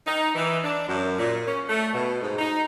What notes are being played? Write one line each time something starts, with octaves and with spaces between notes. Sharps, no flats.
D#4
E3
D4
F#2
A#2
C#4
A3
B2
G#2
D#4